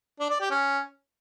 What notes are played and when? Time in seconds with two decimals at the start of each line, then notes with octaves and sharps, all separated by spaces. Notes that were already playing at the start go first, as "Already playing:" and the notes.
0.20 D4
0.30 D5
0.40 G4
0.51 C#4